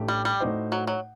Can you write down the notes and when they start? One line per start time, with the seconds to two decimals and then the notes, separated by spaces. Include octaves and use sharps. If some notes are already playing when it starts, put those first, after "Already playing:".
Already playing: A1 A2 A3 D4 G4
0.08 G3
0.25 G3
0.40 A2 A3 D#4 F#4 C5
0.72 F#3
0.87 F#3